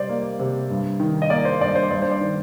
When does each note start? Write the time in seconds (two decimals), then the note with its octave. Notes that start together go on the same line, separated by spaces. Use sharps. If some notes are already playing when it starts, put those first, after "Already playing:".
Already playing: C3 G3 C5 D5 D#5
0.09 A#3
0.39 C3
0.70 G2
1.00 D#3
1.22 D#5
1.30 A#3 D5
1.45 C5
1.60 G2 D5
1.75 C5
1.91 G2 D5
2.02 C5
2.11 D5
2.21 D#3